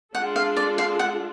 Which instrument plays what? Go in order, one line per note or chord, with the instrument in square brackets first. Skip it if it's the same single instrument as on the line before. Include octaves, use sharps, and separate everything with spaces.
[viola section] G#3 D4 F4 A4 [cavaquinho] F#5
[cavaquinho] F5
D5
F5
F#5